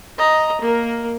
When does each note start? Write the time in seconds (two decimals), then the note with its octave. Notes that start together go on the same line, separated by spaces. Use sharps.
0.18 D#5 A#5
0.61 A#3 A#4